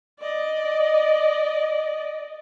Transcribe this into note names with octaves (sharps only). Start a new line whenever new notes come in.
D5 D#5